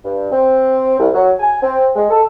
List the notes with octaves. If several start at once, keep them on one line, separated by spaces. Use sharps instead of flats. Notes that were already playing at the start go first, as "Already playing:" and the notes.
G2
C4
C2
F#3
G#5
C4
G#3
A4